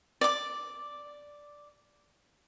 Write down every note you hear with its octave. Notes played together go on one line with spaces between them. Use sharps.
D5 D6